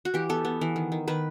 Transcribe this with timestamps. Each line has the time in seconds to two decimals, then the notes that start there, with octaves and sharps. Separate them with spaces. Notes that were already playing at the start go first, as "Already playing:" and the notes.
0.05 F#4
0.14 E3 G4
0.29 B3 A4
0.45 B3
0.61 E3
0.76 D#3
0.92 D#3
1.08 D#3 B4